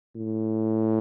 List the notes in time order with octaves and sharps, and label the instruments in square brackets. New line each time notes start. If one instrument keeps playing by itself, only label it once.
[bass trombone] A2